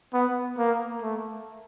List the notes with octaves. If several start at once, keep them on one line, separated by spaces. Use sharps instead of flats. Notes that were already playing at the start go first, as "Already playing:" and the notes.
B3
A#3
A3